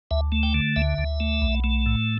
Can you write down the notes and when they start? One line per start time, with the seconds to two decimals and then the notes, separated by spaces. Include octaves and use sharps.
0.11 D2 E5
0.32 A3
0.43 G5
0.54 D3
0.76 D2 E5
0.98 D2
1.20 A3
1.42 B1
1.64 A3
1.86 A2